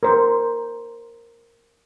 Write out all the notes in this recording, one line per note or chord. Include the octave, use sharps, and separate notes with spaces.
A#4 C5